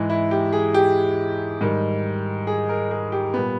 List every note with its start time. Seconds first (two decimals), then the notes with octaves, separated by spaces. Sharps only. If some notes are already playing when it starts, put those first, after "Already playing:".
Already playing: G#2 E3 G#3
0.10 E4
0.31 G4
0.53 G#4
0.74 G4
1.61 G#2 D#3 G3
2.47 G#4
2.69 A#4
2.91 G#4
3.12 G4
3.34 A#2 G3 B3